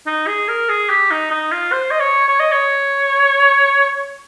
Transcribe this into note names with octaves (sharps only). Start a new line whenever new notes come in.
D#4
G#4
A#4
G#4
G4
D#4
D#4
F4
C5
D#5
C#5
C#5
D#5
C#5